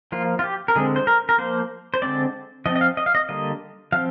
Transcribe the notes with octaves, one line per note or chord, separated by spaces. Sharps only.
F3 A#3 F4
F4
G4
A#4
D3 G#3 C4 G#4
C5
A#4
A#4
F3 A#3 C5
C5
D3 G#3 C4 D5
F3 C4 D#5
D#5
F5
D#5
F5
D#5
D3 G3 A#3 D#5
F3 C4 F5